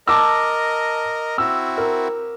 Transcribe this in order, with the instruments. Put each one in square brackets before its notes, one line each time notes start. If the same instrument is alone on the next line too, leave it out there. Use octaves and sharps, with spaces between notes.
[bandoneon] A#4 D#5 [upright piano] A5 D6 E6
[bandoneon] C4 E4 F#4 [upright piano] E6
[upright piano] A#4